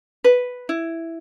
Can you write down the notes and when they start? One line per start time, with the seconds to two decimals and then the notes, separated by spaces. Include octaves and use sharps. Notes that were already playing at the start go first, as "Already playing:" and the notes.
0.24 B4
0.69 E4